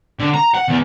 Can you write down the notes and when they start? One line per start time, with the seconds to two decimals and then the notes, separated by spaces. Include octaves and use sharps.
0.20 D3
0.34 A#5
0.55 F#5
0.69 E2